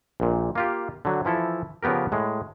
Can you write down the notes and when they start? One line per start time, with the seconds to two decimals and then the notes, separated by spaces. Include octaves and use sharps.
0.20 A#1 A#2
0.55 A#3 F4 G4
1.05 D3 F#3
1.25 E3 F3 E4 A4
1.83 C#3 F3 B3 G4 A#4
2.12 A2 G#3